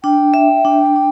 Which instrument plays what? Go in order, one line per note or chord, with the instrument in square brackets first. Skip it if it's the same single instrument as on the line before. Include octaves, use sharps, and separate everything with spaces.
[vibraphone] D4 [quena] G5
[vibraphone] E5
D4
D4